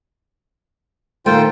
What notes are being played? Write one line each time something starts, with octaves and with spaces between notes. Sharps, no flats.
A#2 D#3 A3 F4 C5 G5